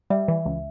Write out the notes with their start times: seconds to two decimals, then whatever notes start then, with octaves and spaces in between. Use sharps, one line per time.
0.10 G3 E5
0.28 E3
0.45 C#2